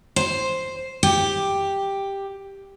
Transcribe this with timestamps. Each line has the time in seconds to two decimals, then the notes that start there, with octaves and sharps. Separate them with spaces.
0.16 C5
1.03 G4